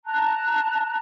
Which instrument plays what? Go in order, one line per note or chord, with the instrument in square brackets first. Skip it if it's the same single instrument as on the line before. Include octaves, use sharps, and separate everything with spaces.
[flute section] A5 A#5 F#6